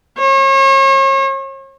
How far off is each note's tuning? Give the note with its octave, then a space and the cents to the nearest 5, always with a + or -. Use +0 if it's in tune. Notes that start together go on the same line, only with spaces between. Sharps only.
C#5 -40